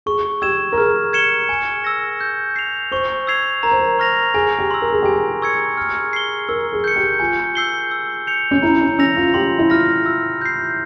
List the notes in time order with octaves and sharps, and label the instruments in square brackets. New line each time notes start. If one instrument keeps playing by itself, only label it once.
[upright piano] G#4 [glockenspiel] C#6
[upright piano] G4 [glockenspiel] E6 G#6 E7
[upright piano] A#4
[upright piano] G#4 [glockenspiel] F6
[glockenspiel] G#6 C#7 E7 G7
G#5
E6 A#6
G6
C7 F7
[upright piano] C5 [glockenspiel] C#6
[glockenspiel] E6 G#6 C7 F7
[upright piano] A#4 [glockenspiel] A#5
[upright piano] C5
A#4
[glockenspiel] C#6 F6 A#6 F7
[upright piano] G#4 [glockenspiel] G#5
[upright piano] G4
[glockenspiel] C6 E6
[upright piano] A#4
G#4
[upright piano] G4 [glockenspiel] G#5
[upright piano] G#4
[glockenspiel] C#6 E6 G#6 C#7
F6
C7 G7
[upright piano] A#4 [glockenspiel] E6
[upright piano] G#4
[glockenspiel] G6 C#7
[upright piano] G4
[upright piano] F4 [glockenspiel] G#5
[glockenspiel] E6 G6 C7 G7
E6
G6 C#7 F7
[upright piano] C#4
[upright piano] E4 [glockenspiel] A#5
[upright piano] C#4
[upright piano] C#4 [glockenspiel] E6 A#6 F7
[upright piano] F4
[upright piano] G4 [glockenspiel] C6
[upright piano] E4
[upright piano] F4 [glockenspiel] F6 A#6
[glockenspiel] E6
G6 C7